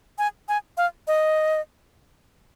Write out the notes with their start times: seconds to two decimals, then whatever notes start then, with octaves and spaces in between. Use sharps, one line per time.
0.18 G#5
0.49 G#5
0.77 F5
1.07 D#5